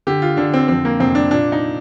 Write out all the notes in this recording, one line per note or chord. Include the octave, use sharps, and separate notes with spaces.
D3 G4
F4
D3 D4
C4
F2 C4
A#3
F1 C4
D4
A#2 D4
D#4